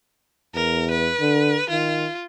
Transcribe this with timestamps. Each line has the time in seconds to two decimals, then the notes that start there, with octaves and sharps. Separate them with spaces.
0.55 E2 A#4
0.91 B4
1.21 D3
1.70 D#3 F4